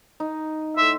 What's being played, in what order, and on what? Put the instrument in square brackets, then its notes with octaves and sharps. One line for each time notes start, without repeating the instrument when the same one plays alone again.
[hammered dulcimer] D#4
[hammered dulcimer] A2 C6 [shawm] E5